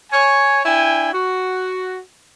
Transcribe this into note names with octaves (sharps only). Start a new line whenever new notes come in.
C#5 G#5
D4 E4 G5 G#5
F#4